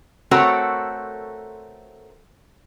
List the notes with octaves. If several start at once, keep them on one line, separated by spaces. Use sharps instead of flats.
A3 C4 F#4 A4 A#4 C#5